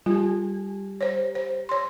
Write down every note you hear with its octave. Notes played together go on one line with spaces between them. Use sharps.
G3 F4 G4
C5 C#5
C5
C#5 C6